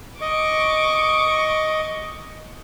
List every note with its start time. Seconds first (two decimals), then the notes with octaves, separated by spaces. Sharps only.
0.21 D#5 C#6 D6